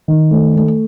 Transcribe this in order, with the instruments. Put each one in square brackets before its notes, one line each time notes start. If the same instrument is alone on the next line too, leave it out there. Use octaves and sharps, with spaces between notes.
[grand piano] D#3
A3
A3